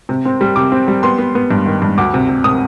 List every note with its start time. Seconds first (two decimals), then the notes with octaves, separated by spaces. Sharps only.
0.09 C3
0.25 C4
0.41 G3
0.56 C3 D6
0.72 C4
0.88 G3
1.03 B3 C6
1.19 B3
1.35 B3
1.51 G2
1.66 D#3
1.82 G2
1.98 D2 D6
2.14 C3
2.29 C3
2.44 C3 D#6